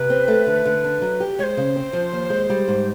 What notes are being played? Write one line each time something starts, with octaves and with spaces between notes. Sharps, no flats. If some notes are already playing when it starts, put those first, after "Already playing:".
Already playing: C3 B4
C4
A3
D3
D3
D4
F#3
G4
G#3 C5 C#5
C#3
C4
F3
D#2
G#3
G3
G#2